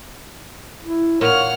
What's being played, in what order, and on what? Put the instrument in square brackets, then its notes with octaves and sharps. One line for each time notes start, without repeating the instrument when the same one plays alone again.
[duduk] E4
[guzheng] A#2 [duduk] C#5 [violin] F#5 F6